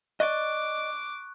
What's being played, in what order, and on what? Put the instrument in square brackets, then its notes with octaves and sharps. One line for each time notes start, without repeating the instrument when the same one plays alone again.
[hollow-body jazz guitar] D5 D#5 [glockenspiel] C#6 F#6 [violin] D6